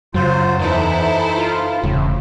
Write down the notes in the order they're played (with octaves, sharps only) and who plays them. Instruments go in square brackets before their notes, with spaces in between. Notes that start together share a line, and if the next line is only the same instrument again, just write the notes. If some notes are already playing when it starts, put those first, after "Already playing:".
[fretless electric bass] F#2 C#3 [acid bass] F#3 [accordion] F4 C5
[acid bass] E2 [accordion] E3 D#4 [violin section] E4 A4 C5
[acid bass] F4
[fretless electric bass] E1 C#3 [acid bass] A2